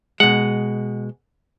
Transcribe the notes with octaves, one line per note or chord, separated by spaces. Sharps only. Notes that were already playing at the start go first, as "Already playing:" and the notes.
B2 G#3 F#5